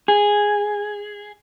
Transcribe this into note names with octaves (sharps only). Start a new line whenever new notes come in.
G#4